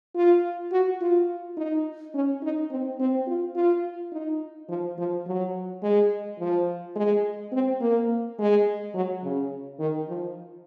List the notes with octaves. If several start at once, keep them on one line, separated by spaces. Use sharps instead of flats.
F4
F#4
F4
D#4
C#4
D#4
C4
C4
F4
F4
D#4
F3
F3
F#3
G#3
F3
G#3
C4
A#3
G#3
F#3
C#3
D#3
F3